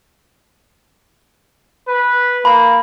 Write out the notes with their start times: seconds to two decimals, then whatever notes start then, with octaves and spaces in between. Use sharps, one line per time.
1.88 B4
2.45 A#3 B5